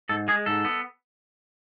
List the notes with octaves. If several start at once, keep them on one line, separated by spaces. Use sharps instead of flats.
G#2 A4
G#3 G#4
G#2 A4
B3